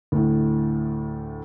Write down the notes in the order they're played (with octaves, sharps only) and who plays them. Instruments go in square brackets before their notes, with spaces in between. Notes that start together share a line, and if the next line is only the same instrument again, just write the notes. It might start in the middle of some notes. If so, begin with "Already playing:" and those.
[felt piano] D2 A2